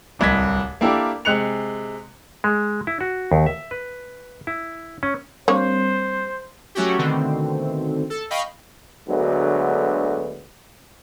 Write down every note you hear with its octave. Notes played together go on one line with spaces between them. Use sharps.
D1 C2 G#6 B6
A#3 D4 E4 G4 A4 A#4
C3 G#3 F#6 C#7 F7
G#3
E4
F#4
D#2
E5
B4
E4
C#4
G3 A#3 C4 D4 C5 C#5
F#3 A3 C#4 F#4 G4
B2 D3 D#3 A3 C4
A4
D#5 F5 G5 B5 C#6
D2 D3 F#3 G#3 B3